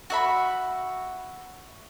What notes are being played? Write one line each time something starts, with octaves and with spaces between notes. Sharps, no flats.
F#4 E5 B5